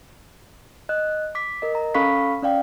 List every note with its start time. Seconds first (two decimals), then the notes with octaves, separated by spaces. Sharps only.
0.89 D#5 F#6
1.35 D6 B6
1.62 A#4 D#5
1.75 A#5
1.94 C#4 A4 F5 B5 C#6 B6
2.42 C#4 D5 F5 G5